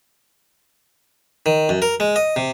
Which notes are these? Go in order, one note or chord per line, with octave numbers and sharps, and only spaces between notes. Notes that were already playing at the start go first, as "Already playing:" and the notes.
D#3
F#2
A#4
G#3
D#5
C3